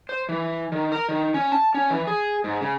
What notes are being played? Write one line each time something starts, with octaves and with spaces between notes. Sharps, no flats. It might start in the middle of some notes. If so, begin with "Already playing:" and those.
C5
E3
D#3
A#4
D#3
C#4
A5
C#4
E3
G#4
G#2
C#3